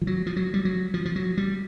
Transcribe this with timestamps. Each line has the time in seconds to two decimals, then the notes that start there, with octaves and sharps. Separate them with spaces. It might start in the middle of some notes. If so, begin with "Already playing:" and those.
0.02 F3
0.07 F#3
0.26 F3
0.36 F#3
0.54 G3
0.65 F#3
0.94 F3
1.05 F3
1.16 F#3
1.37 G3